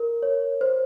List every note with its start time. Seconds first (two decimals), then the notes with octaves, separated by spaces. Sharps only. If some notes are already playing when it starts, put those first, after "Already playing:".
Already playing: A#4
0.23 C#5
0.61 C5